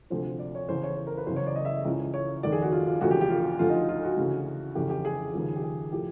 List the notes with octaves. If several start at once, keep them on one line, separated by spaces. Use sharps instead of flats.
D2 C3 F3 C5
D5
C#5
E2 C#3 E3 C5
C#5
C5
A#4
B4
F#1 E2 C#3 C5
C#5
D5
D#5
E5
C#2 C#3 E3
C#5
F1 D#2 D#3 D5
G#4
F#4
F4
F4
E1 D2 C#3 F3 F#4
G4
G4
F4
D2 D3 F3 F4
D#4
F4
F#4
D2 C#3 E3
F1 E2 C#3 G4
G4
G#4
D#2 C#3 F3
G4
G#4
A2 F3 G4